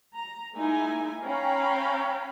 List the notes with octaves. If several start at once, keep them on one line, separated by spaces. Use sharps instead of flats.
A#5
G#3 A#3 D#4 E4 G#5
C#4 F5 G5 A#5 B5